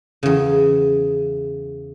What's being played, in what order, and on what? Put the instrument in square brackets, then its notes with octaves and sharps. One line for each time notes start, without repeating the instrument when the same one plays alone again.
[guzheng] E2 C#3